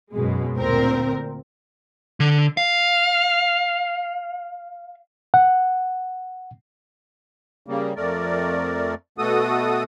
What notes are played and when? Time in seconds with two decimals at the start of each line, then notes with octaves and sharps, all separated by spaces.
0.13 F#2 B2 G#3
0.57 D2 A#2 C4 A#4
2.20 D3
2.57 F5
5.34 F#5
7.67 C#3 G3 A#3
7.96 F2 A3 A#4 D5
9.18 B2 A3 F#4 A4 D#6